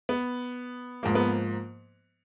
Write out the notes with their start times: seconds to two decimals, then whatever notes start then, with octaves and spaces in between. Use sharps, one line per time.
0.09 B3
1.03 G#2 F3 A#3
1.15 B3